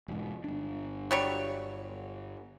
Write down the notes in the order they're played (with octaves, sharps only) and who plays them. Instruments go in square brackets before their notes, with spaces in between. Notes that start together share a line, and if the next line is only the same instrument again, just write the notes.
[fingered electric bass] E1 G#2
G1 D4
[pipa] F#3 G3 C#5